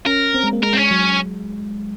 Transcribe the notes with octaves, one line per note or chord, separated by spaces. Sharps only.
C#4 A#4
C4
G#3
A#3
G#3 A#4
C4
C#4
F#3